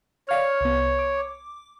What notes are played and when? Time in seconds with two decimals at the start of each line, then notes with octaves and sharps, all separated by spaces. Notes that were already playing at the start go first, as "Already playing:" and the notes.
0.29 C#5 D5 F5 F6
0.61 C2 B3
0.99 D6